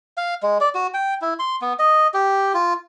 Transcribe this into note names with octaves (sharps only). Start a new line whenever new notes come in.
F5
G#3
D5
F#4
G5
E4
C6
B3
D#5
G4
F4